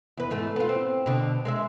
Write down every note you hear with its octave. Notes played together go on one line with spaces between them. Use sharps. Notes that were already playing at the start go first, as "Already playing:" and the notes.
E2 B4
E2 G#2 A3
B3 F4
C4
B2 D3
G#3 A#4 E5